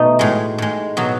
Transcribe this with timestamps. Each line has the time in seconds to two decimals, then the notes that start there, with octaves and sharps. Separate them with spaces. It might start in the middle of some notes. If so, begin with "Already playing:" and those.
Already playing: B2 A3 D#4
0.19 A2 G#3
0.58 A2 G#3
0.97 B2 F#3